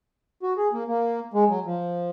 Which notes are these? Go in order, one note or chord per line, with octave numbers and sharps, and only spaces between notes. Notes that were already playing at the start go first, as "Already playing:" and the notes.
F#4
G#4
A#3
A#3
G#3
F#3
F3